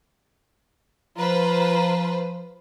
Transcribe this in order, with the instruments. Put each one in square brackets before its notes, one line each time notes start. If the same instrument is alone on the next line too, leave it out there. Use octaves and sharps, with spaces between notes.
[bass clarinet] F3 [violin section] F4 B4 C5 [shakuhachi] A#5